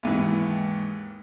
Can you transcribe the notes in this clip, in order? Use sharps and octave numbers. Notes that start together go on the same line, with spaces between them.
D#2 G#2 E3